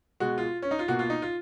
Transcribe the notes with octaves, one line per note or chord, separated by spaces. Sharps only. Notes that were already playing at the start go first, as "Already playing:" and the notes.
B2 G#3 F#4
F4
C#4
D#4
F4
B2 A#3 F#4
F4
D#4
F4